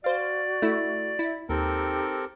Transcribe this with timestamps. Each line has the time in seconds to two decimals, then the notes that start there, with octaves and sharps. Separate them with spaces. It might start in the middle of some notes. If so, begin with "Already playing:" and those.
0.04 F#4 C5 D5 F5
0.62 A3 E4
1.19 E4
1.49 D#2 C4 D#4 G4 A4 A#4